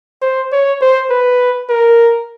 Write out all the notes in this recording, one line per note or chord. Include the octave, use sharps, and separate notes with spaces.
C5
C#5
C5
B4
A#4